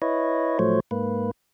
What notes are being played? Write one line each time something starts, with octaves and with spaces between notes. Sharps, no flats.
E4 B4 C#5 D#5
A2 F3 F#3 A3 C5 C#5
G#2 A#3 B4